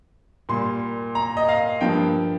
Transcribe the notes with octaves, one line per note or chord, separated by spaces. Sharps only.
A#2 G3 A#3 C6
A#5
D#5
F5
G2 F3 A#3 G5